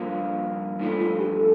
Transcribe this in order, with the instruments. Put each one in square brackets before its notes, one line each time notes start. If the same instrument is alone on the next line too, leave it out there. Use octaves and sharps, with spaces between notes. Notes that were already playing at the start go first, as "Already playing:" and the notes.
Already playing: [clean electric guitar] G2 F3 A#3
[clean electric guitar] G2 F3 A3 [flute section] D#4
[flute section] F4
G4
A4